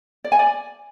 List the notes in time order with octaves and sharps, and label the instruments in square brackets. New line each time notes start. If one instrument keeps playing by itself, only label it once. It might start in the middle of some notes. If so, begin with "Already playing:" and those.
[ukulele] D5
G#5
D5